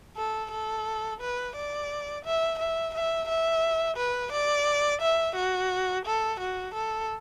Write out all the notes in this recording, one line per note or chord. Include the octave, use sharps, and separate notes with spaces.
A4
A4
B4
D5
E5
E5
E5
E5
B4
D5
E5
F#4
A4
F#4
A4